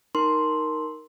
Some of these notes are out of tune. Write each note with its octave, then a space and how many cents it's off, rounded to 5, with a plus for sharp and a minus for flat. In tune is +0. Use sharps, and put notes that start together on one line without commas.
D#4 +10 A#4 +0 C6 +0